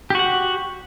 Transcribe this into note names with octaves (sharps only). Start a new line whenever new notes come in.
F#4 G4 F#5